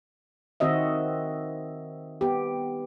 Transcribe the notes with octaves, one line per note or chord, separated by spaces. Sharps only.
D#3 C4 F#4 D#5 E5
B3 G4